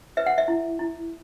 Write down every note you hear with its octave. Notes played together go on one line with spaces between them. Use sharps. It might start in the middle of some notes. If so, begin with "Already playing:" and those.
B4 E5
F#5
E5
E4
E4